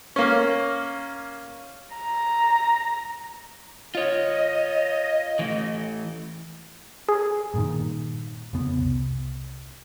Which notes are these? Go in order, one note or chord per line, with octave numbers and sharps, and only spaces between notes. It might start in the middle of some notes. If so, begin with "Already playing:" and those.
A#3 C#4
A#5
F4 C#5 D#5
E3 A3
G#4
G2 A#2 D#3
F2 C#3 B3
C2